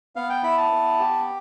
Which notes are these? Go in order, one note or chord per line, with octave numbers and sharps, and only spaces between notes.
B3 F5
G5
E4 B5
A5
B3
G4